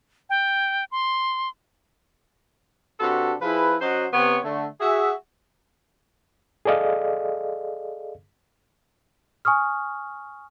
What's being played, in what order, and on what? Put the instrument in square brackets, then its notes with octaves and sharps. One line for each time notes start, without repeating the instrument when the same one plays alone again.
[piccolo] G5
C6
[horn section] C3 D4 F#4 A4 B4
F3 E4 G#4 B4
F#3 C#4 F#4 C5 D#5 F#5
C3 B3 C#5
D3 A3
F#4 G#4 E5
[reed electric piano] G#4 A4 D5 D#5 F5
[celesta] G#5 C#6 D#6 F6